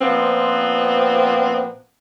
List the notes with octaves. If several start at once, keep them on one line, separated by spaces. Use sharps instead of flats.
A#2 F3 B3 C4